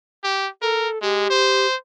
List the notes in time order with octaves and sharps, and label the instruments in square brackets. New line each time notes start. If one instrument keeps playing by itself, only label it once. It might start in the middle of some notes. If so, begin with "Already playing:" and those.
[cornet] G4
[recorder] A4 [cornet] A#4
[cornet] G#3 [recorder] G4
[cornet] C5